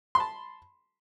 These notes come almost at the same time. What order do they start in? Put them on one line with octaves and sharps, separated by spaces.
C6 B5 A5